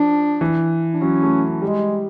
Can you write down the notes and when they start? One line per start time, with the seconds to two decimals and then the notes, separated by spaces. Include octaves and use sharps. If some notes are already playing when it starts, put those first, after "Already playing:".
Already playing: F3 D4
0.41 E3
0.94 D4
1.02 F#3 C#4
1.23 A3
1.62 G3 G#3